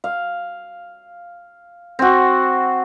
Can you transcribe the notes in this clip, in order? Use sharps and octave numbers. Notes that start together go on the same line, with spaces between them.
F5
C4 F#4